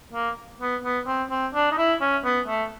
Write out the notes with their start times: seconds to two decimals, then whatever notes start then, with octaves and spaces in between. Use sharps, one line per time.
0.13 A#3
0.60 B3
0.83 B3
1.07 C4
1.30 C4
1.54 D4
1.72 D#4
1.78 E4
2.01 C#4
2.24 B3
2.48 A3